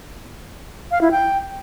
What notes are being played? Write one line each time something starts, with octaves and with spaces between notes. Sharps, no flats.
F5
E4
G5